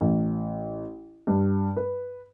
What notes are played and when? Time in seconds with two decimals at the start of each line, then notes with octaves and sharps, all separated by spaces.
0.01 A1
1.27 G2
1.76 B4